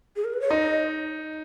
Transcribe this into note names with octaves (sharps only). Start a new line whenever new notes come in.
G#4
A#4
B4
C#5
D#4 D#5